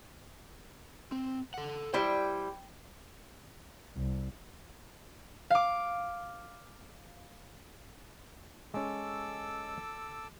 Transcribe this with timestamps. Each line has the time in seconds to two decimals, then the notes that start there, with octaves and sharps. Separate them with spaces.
1.12 C4
1.54 A4 F#5
1.94 G3 E4 C5 G5
3.96 C2
5.50 F5 D6
8.74 G#3 C#4 A4 D6 E6